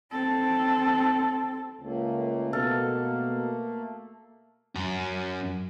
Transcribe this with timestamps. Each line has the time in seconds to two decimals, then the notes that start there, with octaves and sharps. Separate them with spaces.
0.12 C4 A4
1.81 C#2 A3 A#3
2.53 B2 A4 F5
4.76 F#2 A#5